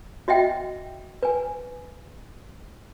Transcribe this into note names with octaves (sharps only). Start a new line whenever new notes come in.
F#4 D#5 E5 F#5 G5
B4 G#5